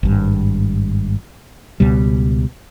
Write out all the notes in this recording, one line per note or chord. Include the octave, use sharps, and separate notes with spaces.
G#1 G2
C#2 B2 G3